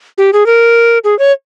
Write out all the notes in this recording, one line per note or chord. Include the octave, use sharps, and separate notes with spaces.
G4
G#4
A#4
G#4
C#5